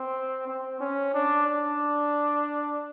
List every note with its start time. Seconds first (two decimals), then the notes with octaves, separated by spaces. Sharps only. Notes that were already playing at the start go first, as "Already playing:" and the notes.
Already playing: C4
0.47 C4
0.80 C#4
1.14 D4
1.47 D4